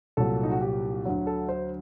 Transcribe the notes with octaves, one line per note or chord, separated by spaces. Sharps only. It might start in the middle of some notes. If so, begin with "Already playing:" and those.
C2 A#2 F#3 A4
D#4
F#4
G4
D2 D3 F#3
A4
C5